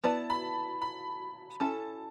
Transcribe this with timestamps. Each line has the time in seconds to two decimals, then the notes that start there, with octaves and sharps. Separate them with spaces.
0.04 B3 E4 B4 D5 A5
0.30 B5
0.82 B5
1.60 C#4 E4 A4 A5